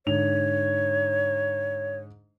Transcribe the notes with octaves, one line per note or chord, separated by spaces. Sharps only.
G#2 D3 C#5 F7